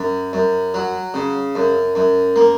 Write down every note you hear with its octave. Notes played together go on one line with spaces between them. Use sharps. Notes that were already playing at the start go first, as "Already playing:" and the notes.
Already playing: F#2
F#2
F#3
C#3
F#2
F#2
A#3